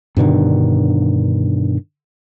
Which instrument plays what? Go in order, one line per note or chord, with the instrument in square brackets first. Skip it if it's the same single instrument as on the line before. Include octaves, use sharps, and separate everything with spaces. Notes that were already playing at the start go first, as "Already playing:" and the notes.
[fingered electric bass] G2 B2 D3 D#3